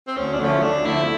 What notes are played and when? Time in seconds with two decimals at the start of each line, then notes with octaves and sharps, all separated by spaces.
0.08 C4
0.17 D2 C#4
0.34 D4
0.40 D3 F3 A3 C#4
0.63 D2 D4
0.85 D3 F3 A3 E4